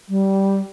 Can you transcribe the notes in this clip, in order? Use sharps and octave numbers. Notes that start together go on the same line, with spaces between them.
G3